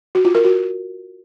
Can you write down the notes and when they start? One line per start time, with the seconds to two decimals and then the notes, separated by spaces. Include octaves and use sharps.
0.15 F#4
0.25 F4
0.35 A#4
0.45 F#4